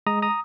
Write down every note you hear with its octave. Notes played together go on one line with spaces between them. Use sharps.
G#3 A#5 D#6
A#5 D#6